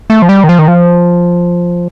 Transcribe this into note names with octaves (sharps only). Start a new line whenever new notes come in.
A3
F3
G3
D#3
F3
D#3
F3